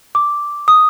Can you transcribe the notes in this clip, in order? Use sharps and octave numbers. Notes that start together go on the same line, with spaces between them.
D6
D#6